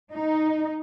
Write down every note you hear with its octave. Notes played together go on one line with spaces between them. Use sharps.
D#4